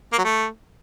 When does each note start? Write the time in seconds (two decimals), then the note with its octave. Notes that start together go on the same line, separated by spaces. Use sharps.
0.12 A#3
0.18 F#3
0.24 A3